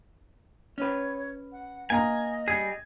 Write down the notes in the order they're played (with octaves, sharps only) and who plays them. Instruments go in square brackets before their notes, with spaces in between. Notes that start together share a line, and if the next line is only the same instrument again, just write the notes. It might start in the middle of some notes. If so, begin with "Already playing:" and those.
[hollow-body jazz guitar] C#4 B4 [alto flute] C#5
[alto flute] F#5
[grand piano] A#3 A#5 [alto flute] D#5 [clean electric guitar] G#5
[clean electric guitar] G3 G#4 [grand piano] G#6